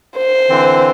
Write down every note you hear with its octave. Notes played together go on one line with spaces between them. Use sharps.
C5
D3 E3 C4